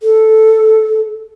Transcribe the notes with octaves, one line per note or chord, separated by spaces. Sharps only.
A4